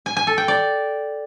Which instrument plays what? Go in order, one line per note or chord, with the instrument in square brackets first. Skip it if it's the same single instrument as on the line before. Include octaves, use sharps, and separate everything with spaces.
[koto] G#5
G#5
A4
G5
D5